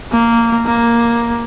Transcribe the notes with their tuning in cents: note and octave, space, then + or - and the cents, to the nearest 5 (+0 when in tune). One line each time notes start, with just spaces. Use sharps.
A#3 -10
A#3 +5